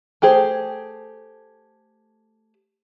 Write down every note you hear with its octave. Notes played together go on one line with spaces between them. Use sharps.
A3 G4 G#4 C5